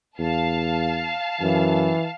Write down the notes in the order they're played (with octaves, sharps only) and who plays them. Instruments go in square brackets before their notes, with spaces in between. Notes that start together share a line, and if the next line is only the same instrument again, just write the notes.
[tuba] E2 [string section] F5 A5
[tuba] F#2 [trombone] E3